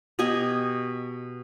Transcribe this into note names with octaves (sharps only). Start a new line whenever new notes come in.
B2 G4 D#5 G#5